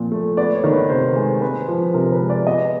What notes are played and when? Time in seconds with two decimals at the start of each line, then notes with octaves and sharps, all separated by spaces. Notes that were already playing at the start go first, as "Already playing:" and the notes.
Already playing: A#2 F3 C4
0.12 A3
0.37 B3 D5
0.55 C#5
0.64 D#3
0.72 B4
0.90 C3 C5
1.16 G#3
1.42 C4 B4
1.69 F3
1.94 C3 A#4
2.12 B4
2.21 G#3
2.30 D5
2.47 B3 D#5